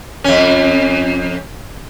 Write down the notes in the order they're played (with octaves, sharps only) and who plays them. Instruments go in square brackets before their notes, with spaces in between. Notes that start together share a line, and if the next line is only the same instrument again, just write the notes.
[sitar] F2 C#4